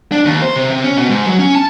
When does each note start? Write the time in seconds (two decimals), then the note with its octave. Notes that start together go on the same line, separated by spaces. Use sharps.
0.12 D4
0.25 D#2
0.42 C5
0.56 C3
0.71 C3
0.84 C#4
0.97 B2
1.09 G#2
1.26 F#3
1.39 C#4
1.55 A5